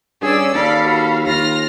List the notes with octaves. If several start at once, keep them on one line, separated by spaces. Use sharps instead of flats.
G2 C#4 G#4 D5 E6
D#2 A4 D5 F5 B5
F#4
D#2 F4 F6 A#6